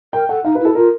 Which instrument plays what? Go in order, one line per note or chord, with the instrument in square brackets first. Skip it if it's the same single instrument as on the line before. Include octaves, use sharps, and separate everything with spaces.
[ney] A#4 [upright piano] G5
[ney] A4 [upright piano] F#5
[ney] D#4 [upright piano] F5
[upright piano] B4
[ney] E4
[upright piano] A4
[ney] F4 [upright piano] A#4